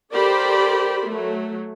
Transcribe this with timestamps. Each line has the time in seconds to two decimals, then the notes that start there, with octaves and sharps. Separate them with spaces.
0.12 G4 A4 A#4 C5 D5 B5
1.05 F#3 A3